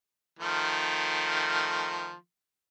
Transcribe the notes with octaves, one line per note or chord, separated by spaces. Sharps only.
D#3 F3 A3